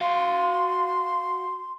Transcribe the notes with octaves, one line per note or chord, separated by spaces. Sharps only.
F#4 F5 C6